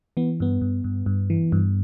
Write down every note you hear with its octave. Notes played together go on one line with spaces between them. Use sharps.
E3 B3
G2 B3
G2
G2
G2
E3
G2